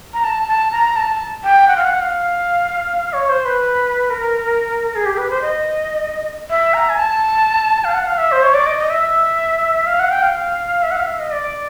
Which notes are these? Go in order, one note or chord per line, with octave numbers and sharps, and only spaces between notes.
A#5
A5
A5
A#5
A5
G5
F#5
F5
F#5
F5
C#5
C5
B4
A#4
G#4
G4
B4
C5
D#5
E5
A#5
G#5
A5
F5
F#5
F5
E5
C5
C#5
D5
D#5
D#5
E5
F5
F#5
G5
F5
E5
F#5
F5
E5
D#5
D5